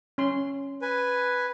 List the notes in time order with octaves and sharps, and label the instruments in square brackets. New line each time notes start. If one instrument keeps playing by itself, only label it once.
[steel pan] C#4 C6
[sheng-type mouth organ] B4 G#5